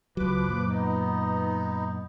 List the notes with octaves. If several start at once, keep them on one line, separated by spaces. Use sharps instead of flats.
C#2 F3 F#3 B4 D6
F#2 A#2
B3 D#4